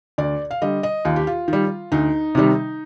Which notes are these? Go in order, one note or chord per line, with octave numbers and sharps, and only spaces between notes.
D2 D5
F5
D3 G3 D#5
D#5
D#2 F4
G4
F4
D#3
G3
D2 D#4
C3 D#3 G3